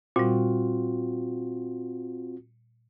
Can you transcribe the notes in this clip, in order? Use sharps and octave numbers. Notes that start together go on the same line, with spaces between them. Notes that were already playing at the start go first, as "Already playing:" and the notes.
A#2 G3 C4 F4 F#4